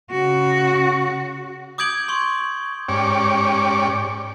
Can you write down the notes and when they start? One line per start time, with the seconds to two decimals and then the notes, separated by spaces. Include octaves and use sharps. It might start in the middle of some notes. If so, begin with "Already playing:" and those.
0.10 C#3 F#4
1.78 D6 D#6 G6 G#6 D7 F#7
2.08 C6 C#6
2.89 G#2 C#4 G4 D5 C#6 D6